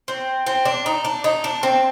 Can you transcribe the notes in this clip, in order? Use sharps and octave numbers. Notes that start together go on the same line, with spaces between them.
C4
C4
D4
D#4
D4
D#4
D4
C4